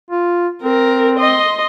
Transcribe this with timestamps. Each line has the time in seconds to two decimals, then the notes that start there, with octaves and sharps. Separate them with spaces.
0.11 F4
0.63 C4 A#4
1.19 D#5 C6